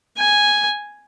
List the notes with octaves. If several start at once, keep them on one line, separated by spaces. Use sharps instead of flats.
G#5